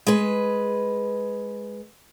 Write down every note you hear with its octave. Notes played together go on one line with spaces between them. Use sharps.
G#3 B4